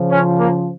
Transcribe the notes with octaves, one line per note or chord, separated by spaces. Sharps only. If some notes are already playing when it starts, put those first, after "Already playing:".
Already playing: C#3 F3
C#4
A#3